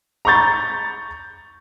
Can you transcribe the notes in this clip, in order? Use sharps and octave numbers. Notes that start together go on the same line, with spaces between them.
A#5 B5 C#6 G6 A6